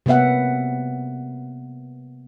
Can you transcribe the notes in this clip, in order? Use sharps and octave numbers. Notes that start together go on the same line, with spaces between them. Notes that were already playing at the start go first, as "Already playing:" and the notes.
C3 A#3 B3 E5 F#5